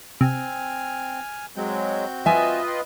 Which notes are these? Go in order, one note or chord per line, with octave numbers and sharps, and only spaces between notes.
C3 C4 G#5 F6
F#3 G#3 C4 F#4 G6
F4 B4 D#5 E5 G#5
G5 B5 C6